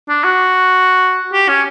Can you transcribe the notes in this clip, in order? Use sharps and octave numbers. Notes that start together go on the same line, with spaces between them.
D4
F#4
G4
C#4